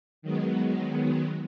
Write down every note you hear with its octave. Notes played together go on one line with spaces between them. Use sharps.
D#3 F#3 G#3 B3